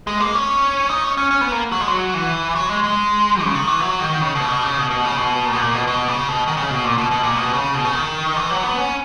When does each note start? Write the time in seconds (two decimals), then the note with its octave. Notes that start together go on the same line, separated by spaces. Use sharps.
0.07 G#3
0.20 A#3
0.34 C#4
0.89 D#4
1.04 C#4
1.17 C#4
1.31 C#4
1.41 B3
1.52 A#3
1.72 F#3
1.81 G#3
1.88 F#3
2.14 E3
2.55 F#3
2.69 G#3
2.84 G#3
3.43 C#3
3.55 D#3
3.67 E3
3.80 F#3
4.00 D#3
4.21 C#3
4.35 B2
4.42 C#3
4.49 B2
4.63 C#3
4.77 B2
4.90 B2
5.05 C#3
5.18 B2
5.46 A#2
5.53 B2
5.60 A#2
5.74 B2
5.88 B2
6.08 C#3
6.29 B2
6.48 D#3
6.57 C#3
6.70 B2
6.85 A#2
6.98 B2
7.11 B2
7.23 A#2
7.36 B2
7.53 C#3
7.74 B2
7.85 C#3
7.95 D#3
8.36 E3
8.51 F#3
8.63 B3
8.78 C#4